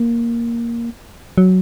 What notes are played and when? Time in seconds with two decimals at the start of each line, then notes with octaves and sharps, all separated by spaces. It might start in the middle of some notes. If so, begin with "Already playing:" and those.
Already playing: A#3
1.38 F#3